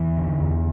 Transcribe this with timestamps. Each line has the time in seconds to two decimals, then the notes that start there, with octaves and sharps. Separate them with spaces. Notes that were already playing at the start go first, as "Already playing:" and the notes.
Already playing: E2 E3
0.17 D3
0.41 E2